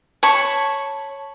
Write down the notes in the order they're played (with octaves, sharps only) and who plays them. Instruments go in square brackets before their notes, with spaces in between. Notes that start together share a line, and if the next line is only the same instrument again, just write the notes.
[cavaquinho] C#5 A5 B5 C#6